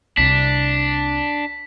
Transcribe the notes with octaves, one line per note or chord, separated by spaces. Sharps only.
C2 C3 D4 B6